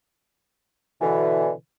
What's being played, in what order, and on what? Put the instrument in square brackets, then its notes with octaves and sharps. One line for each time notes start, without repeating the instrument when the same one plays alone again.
[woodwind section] B2 D3 E3